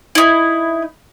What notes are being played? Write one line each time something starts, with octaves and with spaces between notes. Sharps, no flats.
D#4 E4